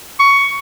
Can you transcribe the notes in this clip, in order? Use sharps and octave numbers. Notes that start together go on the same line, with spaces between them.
C#6